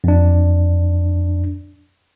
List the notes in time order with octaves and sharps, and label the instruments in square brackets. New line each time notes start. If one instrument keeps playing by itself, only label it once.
[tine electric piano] F2 D4